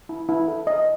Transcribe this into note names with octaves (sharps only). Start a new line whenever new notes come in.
E4
E4
A4
D#5